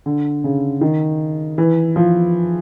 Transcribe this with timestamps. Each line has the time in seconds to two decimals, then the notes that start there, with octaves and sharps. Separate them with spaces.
0.06 D3
0.44 C#3
0.81 D#3
1.58 E3
1.96 F3